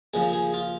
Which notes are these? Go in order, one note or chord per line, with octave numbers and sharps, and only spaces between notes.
D#2 C#3 F3 G#4
G#4
F4